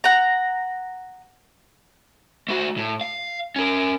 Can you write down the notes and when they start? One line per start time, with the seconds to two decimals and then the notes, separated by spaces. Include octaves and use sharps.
0.04 F#5 A#5
2.48 A3 F#4
2.77 A2
3.01 F5
3.56 C#4 A#4